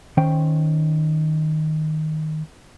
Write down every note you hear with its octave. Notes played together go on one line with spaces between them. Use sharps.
D#3 C#4 C5 G5